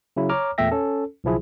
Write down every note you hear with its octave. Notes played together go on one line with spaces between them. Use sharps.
C#3 F#3 E4
C#5 A#5 D6 F6
E2 A#2 A3 E5 G5 A#6
C#4 A4
B1 C#3 F3 E4 G#4